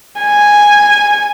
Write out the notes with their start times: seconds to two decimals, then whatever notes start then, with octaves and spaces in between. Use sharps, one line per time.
0.20 G#5